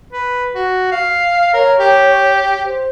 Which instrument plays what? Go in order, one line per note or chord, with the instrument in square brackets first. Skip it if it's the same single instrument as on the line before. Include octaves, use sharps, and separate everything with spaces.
[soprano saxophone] B4
F#4
F5
[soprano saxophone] A#4 [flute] C#5
[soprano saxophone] G4
[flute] C5